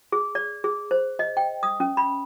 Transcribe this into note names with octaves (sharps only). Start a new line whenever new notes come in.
G#4
D5
G#4
C5
D#5
G5
D#6
C#4
B5